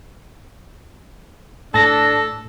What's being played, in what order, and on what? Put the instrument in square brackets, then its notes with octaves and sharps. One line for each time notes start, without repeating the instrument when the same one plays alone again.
[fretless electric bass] A2 [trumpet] D4 [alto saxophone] A4 [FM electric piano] A5 A#6